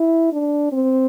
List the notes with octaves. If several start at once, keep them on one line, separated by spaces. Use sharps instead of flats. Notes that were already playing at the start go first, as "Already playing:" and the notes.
Already playing: E4
D4
C4